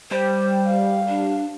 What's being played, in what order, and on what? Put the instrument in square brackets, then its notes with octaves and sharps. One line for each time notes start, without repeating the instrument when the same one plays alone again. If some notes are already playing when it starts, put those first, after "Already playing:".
[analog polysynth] G3 [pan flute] C5
[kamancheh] F5
[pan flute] D4